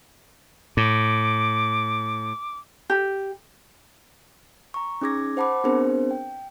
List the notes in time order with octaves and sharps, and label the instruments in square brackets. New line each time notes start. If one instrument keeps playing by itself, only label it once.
[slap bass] A2 [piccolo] D6
[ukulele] G4
[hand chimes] A#5 C#6
C#4 D#4 G#4 D6 G#6 A#6
C5 F#5 A5 B5 D6
B3 C4 D4 G#4 A#4 C5
G5